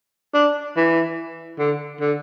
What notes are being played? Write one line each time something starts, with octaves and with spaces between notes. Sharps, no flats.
D4
E3
D3
D3